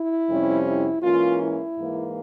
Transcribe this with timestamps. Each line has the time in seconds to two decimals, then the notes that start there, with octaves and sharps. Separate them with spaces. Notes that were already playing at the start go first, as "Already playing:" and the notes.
Already playing: E4
0.29 F2 C3 G3 C#4
0.66 E4
1.03 G#2 E3 A#3 C#4 F4
1.41 E4
1.78 G#2 E3 A#3